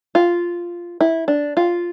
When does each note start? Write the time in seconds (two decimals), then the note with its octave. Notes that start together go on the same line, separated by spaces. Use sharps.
0.15 F4
1.01 E4
1.28 D4
1.57 F4